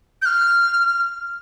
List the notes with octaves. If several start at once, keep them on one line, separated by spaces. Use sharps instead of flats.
G6
F6